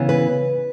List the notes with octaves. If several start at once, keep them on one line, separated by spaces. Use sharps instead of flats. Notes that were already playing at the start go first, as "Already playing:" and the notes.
Already playing: C#3 E3 B3
B4